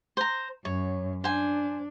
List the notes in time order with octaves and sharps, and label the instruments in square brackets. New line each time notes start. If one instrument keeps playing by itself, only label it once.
[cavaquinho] C5 A#5
[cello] F#2 [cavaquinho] C#5
[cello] D4 [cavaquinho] C5 G#5